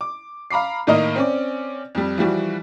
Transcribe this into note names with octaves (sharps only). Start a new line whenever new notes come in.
D6
F5 A#5 B5 D6 C7
A2 D#3 A#3 A#4 D#5 A#5
C4 C#4 D5
F2 G3
E3 F3 G3 F#4